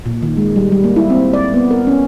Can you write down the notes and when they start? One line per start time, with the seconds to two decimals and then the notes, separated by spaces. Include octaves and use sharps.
0.06 A#2
0.22 D#3
0.37 G#3
0.56 G3
0.72 G3
0.84 A#3
0.96 E4
1.10 C4
1.33 D5
1.54 B3
1.71 A#4
1.87 C#4